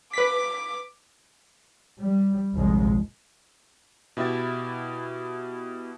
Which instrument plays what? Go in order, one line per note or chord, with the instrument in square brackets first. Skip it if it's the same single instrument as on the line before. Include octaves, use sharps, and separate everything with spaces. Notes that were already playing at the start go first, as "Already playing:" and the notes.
[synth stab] B4 B6 [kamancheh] D6
[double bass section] G3
F1 A#1 D#2 A2 G#3
[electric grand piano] B2 E4 G4 E5 A6